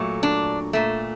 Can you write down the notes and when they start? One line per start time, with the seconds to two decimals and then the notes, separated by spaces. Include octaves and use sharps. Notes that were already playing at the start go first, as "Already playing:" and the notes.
Already playing: A#2 F#3 A3
0.23 D4
0.73 A#2 A3